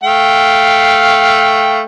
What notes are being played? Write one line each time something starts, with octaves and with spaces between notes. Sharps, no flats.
A3 F5 G5